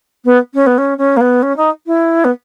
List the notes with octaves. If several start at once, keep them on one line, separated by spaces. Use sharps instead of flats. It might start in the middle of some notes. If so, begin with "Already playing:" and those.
B3
C#4
B3
C#4
C#4
A#3
B3
C#4
D#4
E4
B3